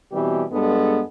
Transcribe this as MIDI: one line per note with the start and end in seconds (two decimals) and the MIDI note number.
0.12 0.44 47
0.12 0.44 52
0.12 0.44 55
0.12 0.44 60
0.12 0.44 67
0.52 1.02 43
0.52 1.02 56
0.52 1.02 59
0.52 1.02 62
0.52 1.02 69